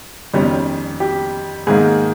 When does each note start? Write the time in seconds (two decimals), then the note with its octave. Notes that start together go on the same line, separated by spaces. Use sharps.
0.33 G1 F2 D#3 G3 C#4
1.00 G4
1.67 G#2 D#3 A#3 G#4